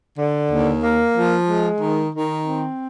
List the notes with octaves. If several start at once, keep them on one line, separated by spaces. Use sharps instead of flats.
D3
D#2
A#3
F3
G#3
D#3
D#3
C4